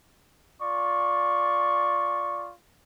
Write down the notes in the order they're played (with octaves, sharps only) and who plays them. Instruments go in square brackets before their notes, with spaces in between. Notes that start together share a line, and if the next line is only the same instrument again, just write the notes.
[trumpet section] F4 D5 C#6